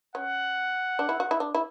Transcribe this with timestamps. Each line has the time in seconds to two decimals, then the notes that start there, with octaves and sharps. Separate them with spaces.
0.15 C#4 F#5
0.99 D4
1.09 E4
1.20 F#4
1.31 E4
1.40 D4
1.54 E4